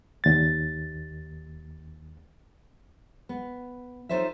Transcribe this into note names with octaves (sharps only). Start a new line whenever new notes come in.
D#2 A6
B3
D#4 F4 A4 C5 C#5 E5